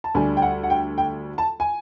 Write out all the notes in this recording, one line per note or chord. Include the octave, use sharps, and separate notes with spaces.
A5
D2 D3 G3 G#5
G5
F#5
F#5
G5
G5
A5
G#5